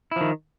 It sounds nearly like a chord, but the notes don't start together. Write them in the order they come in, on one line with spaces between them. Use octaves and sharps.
E4 F3 D#3